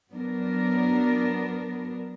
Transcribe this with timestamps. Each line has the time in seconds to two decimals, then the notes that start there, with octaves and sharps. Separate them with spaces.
0.11 F#3 B3 D4 A#4